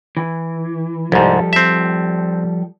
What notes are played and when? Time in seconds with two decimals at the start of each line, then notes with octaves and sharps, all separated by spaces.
0.17 E3
1.12 C2 G#2 F3 G3 A4
1.53 C4 E5